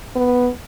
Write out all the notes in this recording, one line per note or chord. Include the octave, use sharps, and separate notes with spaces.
B3